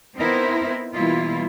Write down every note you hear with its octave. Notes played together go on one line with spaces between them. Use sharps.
B3 C4 D#4 E4 A#4 C5
B2 E3 G3 A#3 E4 F4